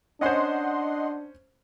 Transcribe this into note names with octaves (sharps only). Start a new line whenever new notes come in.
C#4 D4 C5 D#5 F#5 C6